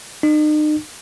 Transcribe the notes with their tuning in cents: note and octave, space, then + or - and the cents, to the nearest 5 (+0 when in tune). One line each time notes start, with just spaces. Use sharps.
D#4 -40